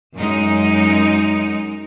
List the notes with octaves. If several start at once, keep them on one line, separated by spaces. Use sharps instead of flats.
F#2 G#3 D#4